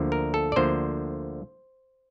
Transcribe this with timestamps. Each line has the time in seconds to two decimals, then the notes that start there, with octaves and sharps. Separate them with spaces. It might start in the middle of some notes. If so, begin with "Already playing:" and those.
Already playing: D2 D3 F3 A#3
0.12 A#4
0.34 A4
0.52 D5
0.56 D2 D3 F3 A#3 C5